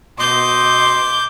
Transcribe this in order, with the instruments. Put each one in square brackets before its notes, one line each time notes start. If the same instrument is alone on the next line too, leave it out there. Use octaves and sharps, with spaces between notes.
[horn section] B2 D#5 C6 [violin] D6 G6